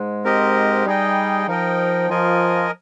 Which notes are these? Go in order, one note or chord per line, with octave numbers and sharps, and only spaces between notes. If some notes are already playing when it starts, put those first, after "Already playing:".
Already playing: G#2 G#3
C4 G4 A#4 D#5
G3 D#4 G#4 D#5 G5
F3 D#4 A#4 D#5 G5
F3 F4 A#4 D#5 G#5